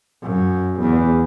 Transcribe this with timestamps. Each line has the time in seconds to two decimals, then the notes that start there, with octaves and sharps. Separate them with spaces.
0.23 F#2
0.81 E2